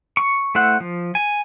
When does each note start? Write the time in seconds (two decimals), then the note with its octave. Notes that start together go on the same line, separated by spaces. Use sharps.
0.17 C#6
0.55 A3 E4 C5 F#5
0.80 F3
1.15 G#5